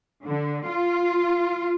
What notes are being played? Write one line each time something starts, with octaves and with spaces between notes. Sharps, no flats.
D3
F4